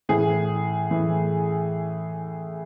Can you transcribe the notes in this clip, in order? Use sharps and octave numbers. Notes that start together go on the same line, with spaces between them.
A2 E3 G#4
A2 E3